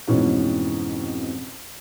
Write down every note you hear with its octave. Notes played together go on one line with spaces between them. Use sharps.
F2 G#2 B2 E3 C#4